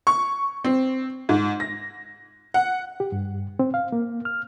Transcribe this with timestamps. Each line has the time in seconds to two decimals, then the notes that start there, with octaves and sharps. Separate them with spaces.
0.07 C#6
0.65 C4
1.29 G#2
1.60 A#6
2.54 F#5
3.00 G4
3.12 G2
3.59 C4
3.74 F5
3.92 A#3
4.25 F6